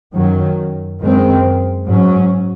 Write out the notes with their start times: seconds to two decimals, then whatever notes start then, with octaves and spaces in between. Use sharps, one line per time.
0.13 F#2 D#3 F#3
1.00 F#2 D#3 G#3 C4
1.86 G#2 F#3 C#4